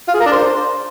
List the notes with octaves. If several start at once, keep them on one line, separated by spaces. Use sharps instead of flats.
F4
G#4
A#4
D4
C5